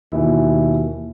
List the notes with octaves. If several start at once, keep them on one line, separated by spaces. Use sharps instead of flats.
D#2 B2 E3 E4